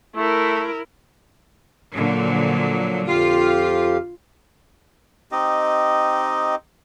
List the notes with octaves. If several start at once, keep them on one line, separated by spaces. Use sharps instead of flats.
A3 E4 A#4
A#2 D3 F#3
F3
F2 F4 G4 F5
C4 D#4 G4 D#5